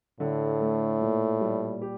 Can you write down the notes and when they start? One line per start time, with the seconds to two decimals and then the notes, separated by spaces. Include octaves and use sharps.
0.20 A2 D3
0.61 A3
1.01 A#2
1.41 G3
1.82 G4